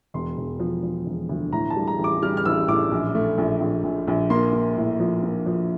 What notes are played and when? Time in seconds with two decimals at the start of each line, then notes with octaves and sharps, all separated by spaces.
0.14 E1 C6
0.37 E1
0.60 F3
0.83 F3
1.06 E1
1.29 D2
1.52 A2 A#5
1.70 A5
1.76 G3
1.87 A#5
1.99 A1
2.04 D6
2.23 G3 F6
2.37 F6
2.45 A1 E6
2.68 A2 D6
2.91 A#1
3.15 A3
3.38 A#1
3.60 A#1
3.84 A#1
4.08 A#1
4.30 A#3 C6
4.53 A#3
4.77 A2
5.00 F3
5.23 A#3
5.46 F3